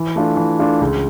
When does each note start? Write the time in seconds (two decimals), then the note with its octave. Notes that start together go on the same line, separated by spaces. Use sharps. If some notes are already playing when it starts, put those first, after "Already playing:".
Already playing: E3
0.15 A3 D4 F4
0.37 E3
0.59 A3 D4 F4
0.81 C#2